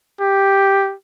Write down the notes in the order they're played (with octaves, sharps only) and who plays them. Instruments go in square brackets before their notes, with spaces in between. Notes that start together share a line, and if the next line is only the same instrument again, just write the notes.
[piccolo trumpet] G4